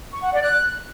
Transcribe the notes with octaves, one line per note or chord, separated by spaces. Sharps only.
C#6
F#5
D5
F#6